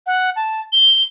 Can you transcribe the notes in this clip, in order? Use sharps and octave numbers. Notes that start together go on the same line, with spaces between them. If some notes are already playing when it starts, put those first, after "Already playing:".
F#5
A5
G7